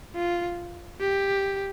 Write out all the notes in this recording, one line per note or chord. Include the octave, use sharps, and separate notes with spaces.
F4
G4